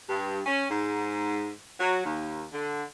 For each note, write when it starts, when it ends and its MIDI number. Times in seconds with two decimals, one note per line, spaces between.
0.09 0.40 43
0.46 0.65 61
0.70 1.51 44
1.80 2.02 54
2.05 2.45 39
2.53 2.82 50